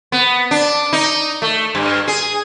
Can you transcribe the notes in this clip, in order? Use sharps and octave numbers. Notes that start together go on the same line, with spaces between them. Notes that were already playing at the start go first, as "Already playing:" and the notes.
B3
D4
D#4
A3
G2
G#4